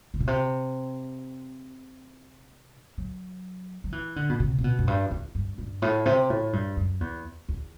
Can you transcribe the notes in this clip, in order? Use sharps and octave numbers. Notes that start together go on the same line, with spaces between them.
C3
B2
C3
F#3
F#3
E3
D3
B2
C3
C3
B2
F#2
G2
E2
G2
G2
A2
C3
A2
G2
F#2
E2
E2